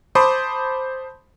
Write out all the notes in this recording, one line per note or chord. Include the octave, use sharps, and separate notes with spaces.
C5 A5 B5 C6 D6 D#6